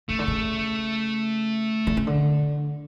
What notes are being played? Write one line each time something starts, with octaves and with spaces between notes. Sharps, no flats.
C#3 A3
D3
C#3
D3
C#3
D3